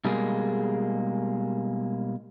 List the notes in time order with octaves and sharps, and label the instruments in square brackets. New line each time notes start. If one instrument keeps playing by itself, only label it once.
[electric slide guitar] B2 G3 G#3 A#3 G#4